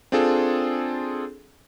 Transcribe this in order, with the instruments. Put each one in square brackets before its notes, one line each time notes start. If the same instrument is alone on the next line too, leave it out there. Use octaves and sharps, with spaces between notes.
[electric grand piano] C4 D4 F4 G#4 A4